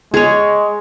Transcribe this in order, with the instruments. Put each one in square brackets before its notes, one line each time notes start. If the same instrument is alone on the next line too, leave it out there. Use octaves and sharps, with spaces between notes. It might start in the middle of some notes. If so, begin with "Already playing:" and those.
[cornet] G#3 [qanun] G#4 C#5